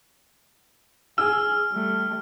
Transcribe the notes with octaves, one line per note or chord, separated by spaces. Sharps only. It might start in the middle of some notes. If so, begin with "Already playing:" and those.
G#4 E6 F6
G3 A3